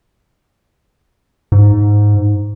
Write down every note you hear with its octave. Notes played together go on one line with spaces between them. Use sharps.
G#2